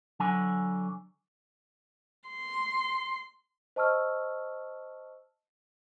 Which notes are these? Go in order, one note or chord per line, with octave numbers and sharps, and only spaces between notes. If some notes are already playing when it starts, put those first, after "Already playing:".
D3 F#3 G#5
C6
C5 D#5 A5 C#6 E6 F6